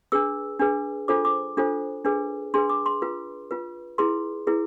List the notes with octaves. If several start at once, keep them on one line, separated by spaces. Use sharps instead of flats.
D4 G#4 B4 E6
D4 G#4 B4
D4 F4 A4 C5 D6
D6
D4 F4 A4 C5
D4 G#4 B4
D4 G#4 B4 C6
D6
C6
F4 B4
F4 B4
E4 G#4 B4 C6
E4 G#4 B4